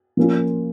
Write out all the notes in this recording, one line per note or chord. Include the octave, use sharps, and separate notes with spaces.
F3 A#3 C#4 F4